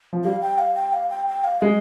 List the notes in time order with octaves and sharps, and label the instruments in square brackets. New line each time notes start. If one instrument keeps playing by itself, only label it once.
[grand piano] F3
[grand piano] G3 [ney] F5
[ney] G5
F5
G5
F5
G5
G5
F5
[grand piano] G#3 [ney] D#5